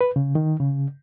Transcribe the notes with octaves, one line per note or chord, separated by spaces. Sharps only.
B4
C#3
D#3
C#3